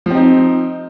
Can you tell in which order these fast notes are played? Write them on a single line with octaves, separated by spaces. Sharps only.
F3 C4 D#4